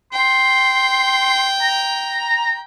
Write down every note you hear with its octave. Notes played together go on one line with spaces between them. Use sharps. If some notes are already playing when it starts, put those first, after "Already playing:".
G5 C6
A#5